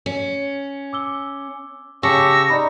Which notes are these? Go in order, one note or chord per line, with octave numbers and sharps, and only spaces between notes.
C#4
D6 E6 G7
C#3 G4 G#5 A5 C#6 E6 A#6
D#4 D5 A#5 B5